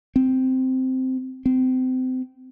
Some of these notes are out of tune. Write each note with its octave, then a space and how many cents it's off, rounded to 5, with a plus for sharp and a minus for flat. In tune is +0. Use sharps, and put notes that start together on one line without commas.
C4 -10
C4 -30